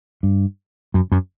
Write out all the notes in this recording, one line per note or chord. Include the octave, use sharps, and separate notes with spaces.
G2
F#2
F#2